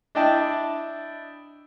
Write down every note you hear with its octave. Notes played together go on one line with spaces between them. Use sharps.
D4 E4 D#5 G5 A5